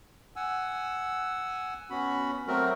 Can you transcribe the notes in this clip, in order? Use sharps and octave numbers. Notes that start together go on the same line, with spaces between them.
F#5 G#5 E6
B3 C#4 F#4 B5
F#3 A3 C4 F#4 A#4